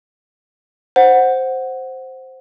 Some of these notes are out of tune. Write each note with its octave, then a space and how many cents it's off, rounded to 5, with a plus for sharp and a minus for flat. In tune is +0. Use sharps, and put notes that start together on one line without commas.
C5 +0 F#5 +0